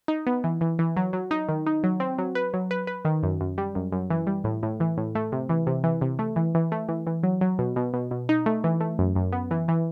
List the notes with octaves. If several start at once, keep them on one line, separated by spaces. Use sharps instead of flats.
D#4
B3
E3
E3
E3
F#3
F#3
D#4
D#3
D#4
F#3
C4
F#3
B4
F#3
B4
B4
D#3
F#2
F#2
G3
F#2
F#2
E3
G3
A2
A2
E3
A2
A3
C3
E3
C3
E3
C3
A3
E3
E3
A3
E3
E3
F#3
F#3
B2
B2
B2
B2
D#4
A3
E3
A3
F#2
F#2
B3
E3
E3